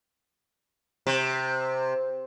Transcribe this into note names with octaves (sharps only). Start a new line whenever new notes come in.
C3